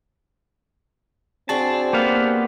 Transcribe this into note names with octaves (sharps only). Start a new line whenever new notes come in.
C4 D4 F#4 G#4 A5
A#3 B3 G4 F5